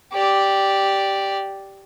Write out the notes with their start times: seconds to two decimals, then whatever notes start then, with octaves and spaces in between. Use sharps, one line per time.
0.13 G4 D5